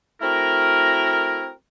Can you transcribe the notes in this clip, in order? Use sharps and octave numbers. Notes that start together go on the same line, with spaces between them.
A3 C4 E4 F#4 A#4